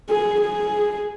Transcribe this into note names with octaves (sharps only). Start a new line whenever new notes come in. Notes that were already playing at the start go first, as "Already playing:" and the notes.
G#4
G#4